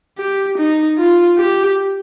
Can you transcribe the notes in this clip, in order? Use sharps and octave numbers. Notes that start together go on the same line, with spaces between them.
G4
D#4
F4
G4